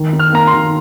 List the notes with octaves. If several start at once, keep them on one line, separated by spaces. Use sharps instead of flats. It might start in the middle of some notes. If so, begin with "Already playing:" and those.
Already playing: D#3
D#4
F6
A#3 A#5
C6
D#3